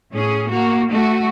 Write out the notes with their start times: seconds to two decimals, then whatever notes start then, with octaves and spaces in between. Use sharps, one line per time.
0.12 A2 C#4 G#4
0.49 A#3 F#4
0.90 A3 F#4